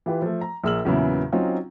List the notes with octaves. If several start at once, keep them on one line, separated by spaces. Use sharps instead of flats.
E3 F4 G4 B4
F3 A3
A#5
A#1 G#4 A#4 E6 F6 F#7
E2 A#2 C#3 F#3 B3 E4
F#3 C4 C#4 D#4 F4